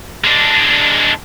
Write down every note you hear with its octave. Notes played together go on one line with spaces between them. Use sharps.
G#3 D4